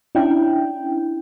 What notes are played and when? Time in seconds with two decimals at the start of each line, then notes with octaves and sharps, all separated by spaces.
0.15 C#4 D4 E4 G5